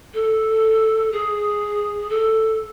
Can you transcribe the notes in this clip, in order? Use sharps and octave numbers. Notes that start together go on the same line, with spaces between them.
A4
G#4
A4